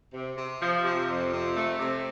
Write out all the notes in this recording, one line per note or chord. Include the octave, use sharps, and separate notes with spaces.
C3
C3
F3
C3
F2
C3
A3
C3